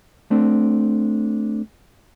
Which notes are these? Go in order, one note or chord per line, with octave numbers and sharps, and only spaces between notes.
A3 C4 D4